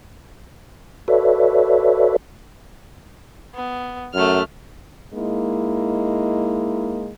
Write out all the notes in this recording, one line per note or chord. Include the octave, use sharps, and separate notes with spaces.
F#4 A4 B4 C#5 D5 E5
B3
F#2 A3 F6
G#3 A#3 D#4 E4